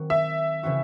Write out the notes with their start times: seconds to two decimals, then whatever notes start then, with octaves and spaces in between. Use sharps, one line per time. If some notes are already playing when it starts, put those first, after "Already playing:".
Already playing: D#3 F#3 C4 F#4
0.10 E5
0.63 C#3 E3 C4 F#4